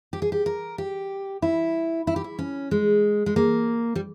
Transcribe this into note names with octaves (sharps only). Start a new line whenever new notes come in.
G4
G#4
G4
A#4
G4
E4
E4
G4
E4
C#4
G#3
G#3
A#3
G3